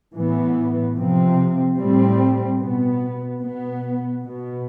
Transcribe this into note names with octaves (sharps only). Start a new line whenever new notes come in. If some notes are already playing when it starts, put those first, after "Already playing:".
A2 E3 B3
C3 F3 C4
A2 G3 C4
B2 B3
B2 B3
B2 B3